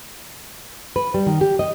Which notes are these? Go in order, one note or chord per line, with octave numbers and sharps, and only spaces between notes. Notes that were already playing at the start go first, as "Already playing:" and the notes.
B4
G3
D#3
G4
D#5